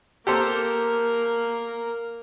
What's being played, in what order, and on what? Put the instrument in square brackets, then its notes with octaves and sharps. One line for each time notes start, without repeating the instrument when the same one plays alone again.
[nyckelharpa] A#3 A#4 [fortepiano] G4 A4 C5